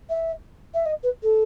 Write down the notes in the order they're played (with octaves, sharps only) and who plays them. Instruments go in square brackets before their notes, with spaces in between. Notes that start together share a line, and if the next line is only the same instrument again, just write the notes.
[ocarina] E5
E5
D#5
B4
A4